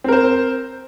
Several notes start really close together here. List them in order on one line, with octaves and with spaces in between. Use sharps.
C4 A#4 C5